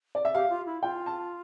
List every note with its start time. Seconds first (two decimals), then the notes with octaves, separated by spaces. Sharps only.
0.15 D5
0.25 E5
0.34 G4 F5
0.50 F4
0.66 E4
0.82 F4 G5
1.06 A5